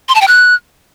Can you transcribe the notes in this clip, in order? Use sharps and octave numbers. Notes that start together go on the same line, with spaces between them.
C6
A5
G5
F#6